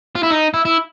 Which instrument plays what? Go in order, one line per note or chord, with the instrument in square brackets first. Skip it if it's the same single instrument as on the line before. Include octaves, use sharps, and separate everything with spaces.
[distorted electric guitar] F4
E4
D#4
E4
E4